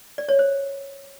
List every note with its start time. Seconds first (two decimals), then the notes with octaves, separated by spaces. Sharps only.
0.18 D5
0.29 C#5
0.39 C5